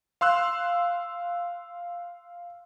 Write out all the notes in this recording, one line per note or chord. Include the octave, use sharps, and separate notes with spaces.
F5 C6 E6 F#6